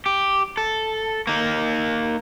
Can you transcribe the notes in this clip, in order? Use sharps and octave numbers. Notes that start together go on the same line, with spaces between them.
G4
A4
A#3 D#4